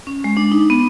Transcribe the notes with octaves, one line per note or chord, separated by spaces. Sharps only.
C#4
G#3
D4
D#4
B3